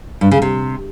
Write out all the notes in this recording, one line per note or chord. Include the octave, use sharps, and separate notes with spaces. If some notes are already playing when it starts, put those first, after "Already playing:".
G2
C#3
C3